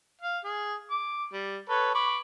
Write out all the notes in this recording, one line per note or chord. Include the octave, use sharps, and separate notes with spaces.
F5
G#4
D6
G3
A4 B4 C#5
B5 C#6 D6